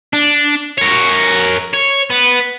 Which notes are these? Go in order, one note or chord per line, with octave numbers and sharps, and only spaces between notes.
D4
A#4 C#5
C#5
B3